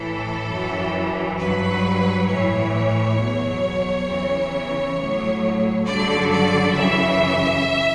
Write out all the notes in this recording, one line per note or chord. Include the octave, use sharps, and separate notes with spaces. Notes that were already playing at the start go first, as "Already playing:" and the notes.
Already playing: A2 E3 A4
F#2 E3
G2 F#3 B4
A2 E3 C#5
E2 B2 F#3
E2 C#3 E3
A2 F#3
G2 D3 F#3 D5
D5
F#2 C#3 E3 E5